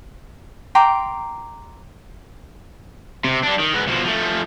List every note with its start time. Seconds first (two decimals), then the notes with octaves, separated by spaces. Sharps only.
0.75 G5 A#5 C6 D6
3.24 C3
3.43 G3 D4
3.59 D#3
3.74 G#2 B3
3.88 B2 F3
4.05 F3 A3